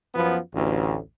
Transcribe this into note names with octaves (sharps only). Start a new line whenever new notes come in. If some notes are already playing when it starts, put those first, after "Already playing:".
F#2 F3 B3
A1 D2